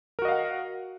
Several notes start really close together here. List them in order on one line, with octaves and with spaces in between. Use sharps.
A#4 F#4 D#5 F5 F#5